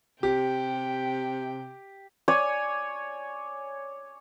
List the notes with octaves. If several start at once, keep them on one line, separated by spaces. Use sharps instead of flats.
C3 G4 G5
C#5 D5 G#5